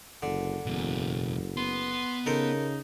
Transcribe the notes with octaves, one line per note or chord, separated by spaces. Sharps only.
F#1 D3
F#1 E2 B2
B3 C6
C#3 D#4 A4 A#4 C5